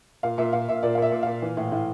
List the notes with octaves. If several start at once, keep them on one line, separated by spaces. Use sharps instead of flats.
A#2 F5
A#2 E5
A#2 F5
A#2 E5
A#2 D5
F5
A#2 E5
A#2
A#2 F5
E3
A2
A2